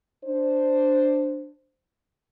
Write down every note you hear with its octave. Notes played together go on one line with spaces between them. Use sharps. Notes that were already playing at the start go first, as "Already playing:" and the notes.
D4 C5